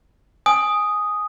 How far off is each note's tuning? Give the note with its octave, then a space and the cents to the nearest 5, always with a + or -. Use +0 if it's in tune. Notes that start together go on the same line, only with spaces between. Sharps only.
G#5 +0 D#6 +0